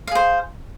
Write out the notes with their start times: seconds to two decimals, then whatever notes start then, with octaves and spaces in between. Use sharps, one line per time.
0.07 F5
0.11 G#4
0.15 C5